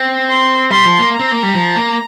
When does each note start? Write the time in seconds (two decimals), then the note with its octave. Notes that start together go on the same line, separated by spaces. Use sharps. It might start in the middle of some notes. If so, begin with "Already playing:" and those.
Already playing: C4
0.29 C6
0.70 G3 C6
0.85 F3
0.99 A#3
1.13 A#5
1.19 C4
1.32 A#3
1.43 G3
1.54 F3
1.76 A#3